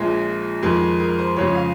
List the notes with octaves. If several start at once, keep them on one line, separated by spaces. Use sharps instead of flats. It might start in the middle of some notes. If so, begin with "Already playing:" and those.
Already playing: A#1 A#2 F3 G#3 G#4
F2 D#3 G#3
A#4
C5
F2 C#3 G#3 C#5
F5